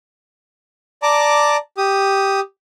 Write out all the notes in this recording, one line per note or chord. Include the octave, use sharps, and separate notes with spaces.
D5 A5 A#5 D6
G4 D#6